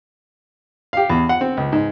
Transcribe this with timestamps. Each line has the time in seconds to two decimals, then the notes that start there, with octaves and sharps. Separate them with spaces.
0.93 G4 F5
1.09 E2
1.29 F#5
1.41 C4
1.57 C#2
1.72 G#2